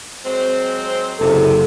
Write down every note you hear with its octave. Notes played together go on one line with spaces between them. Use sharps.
F#3 G#3 C4
F#1 C3 A4